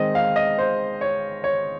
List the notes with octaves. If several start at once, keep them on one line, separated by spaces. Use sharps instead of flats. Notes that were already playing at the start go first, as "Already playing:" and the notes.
Already playing: D#3 G#3 C4 C5 D#5
F5
D#5
C5
C#5
C#5